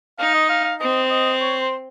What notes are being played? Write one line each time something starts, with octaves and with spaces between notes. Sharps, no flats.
D#4 F5
D#5
F5
F5
C4 D#5
D#5
C#5
C5